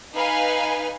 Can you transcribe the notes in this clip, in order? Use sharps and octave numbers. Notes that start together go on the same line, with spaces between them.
D#4 B4 F5 G#5